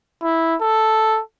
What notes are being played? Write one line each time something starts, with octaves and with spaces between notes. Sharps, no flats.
E4
A4